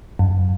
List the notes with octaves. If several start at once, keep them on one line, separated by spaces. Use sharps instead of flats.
F#2